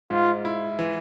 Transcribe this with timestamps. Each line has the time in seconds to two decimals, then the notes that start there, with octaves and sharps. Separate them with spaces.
0.10 G#2 F4
0.45 E4
0.79 E3